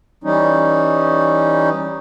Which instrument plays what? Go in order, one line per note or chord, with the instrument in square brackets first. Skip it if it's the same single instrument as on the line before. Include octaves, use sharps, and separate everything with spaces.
[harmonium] E3 G3 C#4 D#4